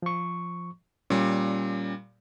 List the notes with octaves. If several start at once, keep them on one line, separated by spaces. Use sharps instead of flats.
F3 C#6
A#2 G3 C#4